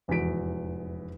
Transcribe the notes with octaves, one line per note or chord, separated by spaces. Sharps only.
F1 E2 G#2 F#4 B6 D7